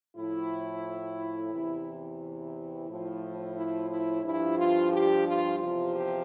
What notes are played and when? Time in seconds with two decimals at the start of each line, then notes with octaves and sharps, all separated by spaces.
0.16 A2 F3 E4
1.53 E2 C3 E3
2.20 E4
2.88 A2 F3
3.56 E4
3.90 E4
4.23 G2 F3 E4
4.57 F4
4.92 G4
5.26 F4
5.59 E2 C3 F3 F4
5.93 G4